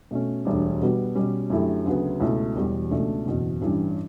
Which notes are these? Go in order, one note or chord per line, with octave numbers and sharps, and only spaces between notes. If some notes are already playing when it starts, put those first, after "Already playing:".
B2 A3 C#4
E1 D2 D3 G3 D4
B2 G3 B3 F#4
B2 G3 C#4
F#2 D3 A3 E4 G4
D2 C#3 F#3 B3
C#2 B2 A3 E4
E1 E2 B2 G3
C#2 B2 A3 D4
F#1 E2 B2
A1 G2 E3 G3 C#4